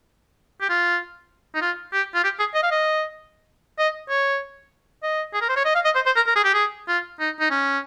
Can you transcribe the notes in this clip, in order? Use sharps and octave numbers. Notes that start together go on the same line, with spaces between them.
G4
F4
D#4
F4
G4
F4
G4
G#4
D#5
F5
D#5
D#5
C#5
D#5
G#4
A#4
C5
C#5
D#5
F5
D#5
C5
C5
A#4
A#4
G#4
G4
G#4
F4
D#4
D#4
C#4